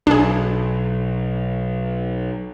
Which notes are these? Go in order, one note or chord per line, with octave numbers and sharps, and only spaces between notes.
B1 D4 G#4